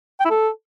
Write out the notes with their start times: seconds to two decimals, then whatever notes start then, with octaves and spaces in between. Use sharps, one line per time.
0.20 G5
0.25 E4
0.30 A4